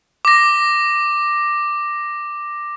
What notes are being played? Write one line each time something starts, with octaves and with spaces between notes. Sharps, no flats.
D6 A#6